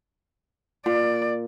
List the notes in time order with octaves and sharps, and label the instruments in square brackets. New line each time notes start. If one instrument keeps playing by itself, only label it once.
[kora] A#2 [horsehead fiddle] D5